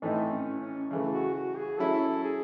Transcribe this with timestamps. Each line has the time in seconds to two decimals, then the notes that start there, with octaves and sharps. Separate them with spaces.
0.01 A2 E3 A3 C4 D#4
0.31 C#4
0.61 C#4
0.91 C#3 E3 A3
1.13 F#4
1.34 F#4
1.57 G#4
1.78 F#3 C#4 E4 A4
2.24 G#4